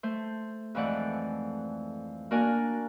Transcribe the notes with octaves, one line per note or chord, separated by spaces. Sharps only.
A3 C5
F2 G#2 E3 A3 D5 F#5
A#3 D4 F#4 A#4 D5 G#5